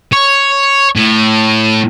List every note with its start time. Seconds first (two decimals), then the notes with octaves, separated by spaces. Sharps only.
0.13 C#5
0.96 A2